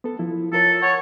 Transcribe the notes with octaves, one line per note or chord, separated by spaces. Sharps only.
B3 A4
F3 E4
F4 A4 A#4 C#5
C#5 F#5